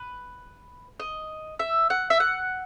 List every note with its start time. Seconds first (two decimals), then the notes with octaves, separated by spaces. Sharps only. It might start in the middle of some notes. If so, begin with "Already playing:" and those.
Already playing: B4
1.00 D#5
1.59 E5
1.90 F#5
2.10 E5
2.20 F#5